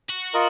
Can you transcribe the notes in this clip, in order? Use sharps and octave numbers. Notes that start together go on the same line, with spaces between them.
F#4
F4 A#4 D#5